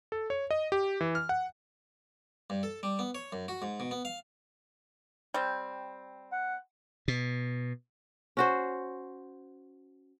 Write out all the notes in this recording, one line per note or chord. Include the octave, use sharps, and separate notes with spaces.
A4
C#5
D#5
G4
E3
F6
F#5
G2
A4
G3
B3
C#5
F#2
F#4
G#2
B2
B3
F5
G3 C4
F#5
B2
C#4 F#4 C5